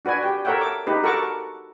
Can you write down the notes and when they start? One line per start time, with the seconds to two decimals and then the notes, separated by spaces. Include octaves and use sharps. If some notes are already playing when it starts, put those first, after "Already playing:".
0.05 D4 F#4 B4 D5 G#5
0.23 G4 G5
0.45 A4 A#4 C#5 E5 F#5 G5
0.61 D6
0.87 D#4 G4 B4
1.03 F#4 A4 A#4 F#5 C#6 D6